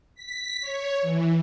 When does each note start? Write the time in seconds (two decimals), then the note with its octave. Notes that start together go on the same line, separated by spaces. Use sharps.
0.15 B6
0.60 C#5
1.02 E3